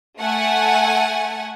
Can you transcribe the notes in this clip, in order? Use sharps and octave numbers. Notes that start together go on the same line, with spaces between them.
A3 F#5 G#5